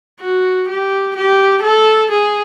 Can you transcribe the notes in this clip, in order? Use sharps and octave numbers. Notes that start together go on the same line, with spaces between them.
F#4
G4
G4
A4
G#4